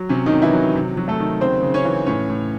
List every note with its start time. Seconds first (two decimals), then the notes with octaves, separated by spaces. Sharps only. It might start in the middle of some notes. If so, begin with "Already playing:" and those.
Already playing: F#3
0.09 C3 C#4
0.26 D#3 D#4
0.32 C3
0.42 E3 E4
0.53 F#3
0.76 C3
0.97 F#3
1.08 A3 A4
1.20 D#3
1.41 C#3 C4 C5
1.63 C#3
1.74 C#4 C#5
1.85 E3
2.06 A2 C#4 C#5
2.30 A2